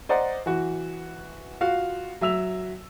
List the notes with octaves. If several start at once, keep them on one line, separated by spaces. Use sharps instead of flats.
C5 D5 D#5 F#5 A#5
E3 F#4
F4 F#4 F5
F#3 E5 E6 F7